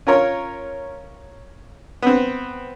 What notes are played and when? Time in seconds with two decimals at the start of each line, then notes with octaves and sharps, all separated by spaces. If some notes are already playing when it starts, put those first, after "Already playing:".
0.07 C#4 F4 A#4 C#5
2.02 B3 C4